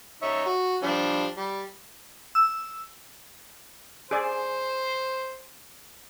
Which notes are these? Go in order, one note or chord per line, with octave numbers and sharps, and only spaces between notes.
D#4 C#5 E5
F#4
F3 G3 D4
G3
E6
G#4 C5 D5